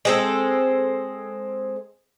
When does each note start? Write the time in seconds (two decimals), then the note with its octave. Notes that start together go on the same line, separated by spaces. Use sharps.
0.05 G#3 C4 A4